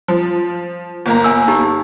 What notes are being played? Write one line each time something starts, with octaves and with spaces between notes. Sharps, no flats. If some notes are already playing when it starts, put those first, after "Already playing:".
F3
G1 A#3 A#5
G#5 E6
D#4 G4